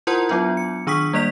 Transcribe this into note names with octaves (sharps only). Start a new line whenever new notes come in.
E4 F4 A#4 C5 F#5 C6
F#3 B3 D4 F4
C#7
D#3 D4 C#6 D#6 B6
G3 A#3 D5 B6 F7